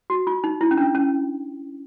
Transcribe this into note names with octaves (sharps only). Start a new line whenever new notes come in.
F#4
F4
D#4
E4
C#4
D4
C#4